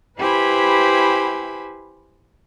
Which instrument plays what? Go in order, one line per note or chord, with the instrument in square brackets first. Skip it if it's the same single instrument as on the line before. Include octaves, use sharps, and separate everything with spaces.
[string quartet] E4 G4 B4 C5 G#5 B5